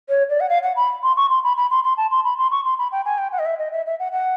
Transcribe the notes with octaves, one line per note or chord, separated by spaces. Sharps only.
C#5
D5
F#5
F5
F#5
B5
C6
C#6
C6
B5
B5
C6
C6
A5
C6
B5
C6
C#6
C6
B5
G5
G#5
G5
F#5
D#5
E5
D#5
E5
E5
F#5
F#5